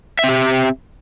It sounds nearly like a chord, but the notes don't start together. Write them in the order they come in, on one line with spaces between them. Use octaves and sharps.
E5 C4 G4